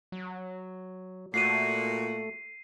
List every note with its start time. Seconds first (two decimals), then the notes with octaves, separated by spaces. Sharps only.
0.12 F#3
1.34 A#2 A3 F#4 C7 D#7